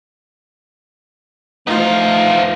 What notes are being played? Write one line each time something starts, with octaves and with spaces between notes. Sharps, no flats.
F3 A3 B3 D#4 F4 F5